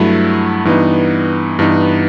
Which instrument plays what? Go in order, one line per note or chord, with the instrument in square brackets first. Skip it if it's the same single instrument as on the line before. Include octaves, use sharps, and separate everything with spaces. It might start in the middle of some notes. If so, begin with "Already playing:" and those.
Already playing: [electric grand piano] G2 F#3 A3 E4
G2 E3 B3 D#4
G2 E3 B3 D#4